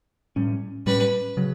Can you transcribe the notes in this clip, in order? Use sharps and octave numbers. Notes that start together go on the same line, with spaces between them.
A2 G3 C#4
A2 G3 C#4 B4
C#3 F#3